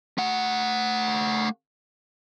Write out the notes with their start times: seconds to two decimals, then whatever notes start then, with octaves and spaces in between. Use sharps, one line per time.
0.18 A3 F#5